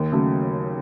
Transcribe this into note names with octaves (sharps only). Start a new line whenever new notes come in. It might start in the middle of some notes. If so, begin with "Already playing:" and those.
Already playing: D#2
C#3 F#3 A3